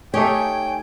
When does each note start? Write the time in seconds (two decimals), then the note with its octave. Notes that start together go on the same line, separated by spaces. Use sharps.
0.14 A3 D#4 G4 C#5 G5 G#5